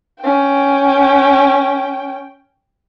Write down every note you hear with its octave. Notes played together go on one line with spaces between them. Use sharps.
C#4 G5